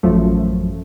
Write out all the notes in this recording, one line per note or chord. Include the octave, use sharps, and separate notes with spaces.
A1 F#2 F3 A3